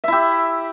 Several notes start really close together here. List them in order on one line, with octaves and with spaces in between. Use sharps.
E5 E4 G4